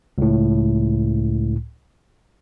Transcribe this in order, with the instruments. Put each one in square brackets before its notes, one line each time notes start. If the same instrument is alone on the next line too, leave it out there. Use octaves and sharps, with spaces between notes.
[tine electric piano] C#2 A2